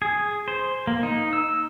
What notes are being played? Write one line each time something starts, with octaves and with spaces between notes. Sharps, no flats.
G#4
C5
A#3
D#4
E6